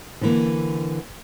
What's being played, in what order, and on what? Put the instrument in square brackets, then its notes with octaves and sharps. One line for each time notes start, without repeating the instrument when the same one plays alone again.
[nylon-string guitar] D3 E3 A#3